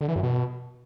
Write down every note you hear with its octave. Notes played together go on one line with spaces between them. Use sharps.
D3
E3
F#2
B2